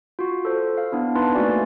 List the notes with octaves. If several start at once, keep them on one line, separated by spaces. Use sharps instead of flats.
F4 F#4
A4 C5
F5
B3 D4 E4
D#4 E4 B4 A5 C6
A3 A#3 C4 F#4 D5 G#5